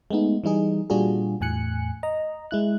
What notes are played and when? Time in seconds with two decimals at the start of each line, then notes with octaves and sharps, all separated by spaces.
0.11 G#3 A3 B3 D#4
0.44 E3 G3 D#4 G#4
0.90 A#2 G3 D4 F4 F#4 G#4
1.40 E2 A2 G#5 F#6 C#7
2.03 D#5 A#5
2.51 G#3 E4 F#6